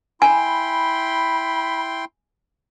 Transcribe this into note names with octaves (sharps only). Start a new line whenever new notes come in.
E4 G5 G#5 B5 C6